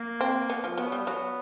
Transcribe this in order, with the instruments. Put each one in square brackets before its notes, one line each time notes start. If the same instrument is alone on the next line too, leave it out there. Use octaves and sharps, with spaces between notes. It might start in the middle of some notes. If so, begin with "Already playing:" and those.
Already playing: [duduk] A#3
[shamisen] C4
B3
F3
[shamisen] F#3 [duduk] B3
[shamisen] G3
F#3